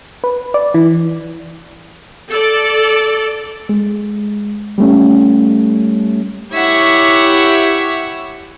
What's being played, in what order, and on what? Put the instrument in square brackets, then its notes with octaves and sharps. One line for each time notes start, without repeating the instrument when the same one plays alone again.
[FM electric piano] B4
D5
E3
[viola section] A4 D5
[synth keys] G#3
G3 A3 C#4
[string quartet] E4 G4 C#5 E5 F#5